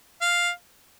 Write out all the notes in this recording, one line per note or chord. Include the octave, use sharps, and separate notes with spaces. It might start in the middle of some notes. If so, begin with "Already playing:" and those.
F5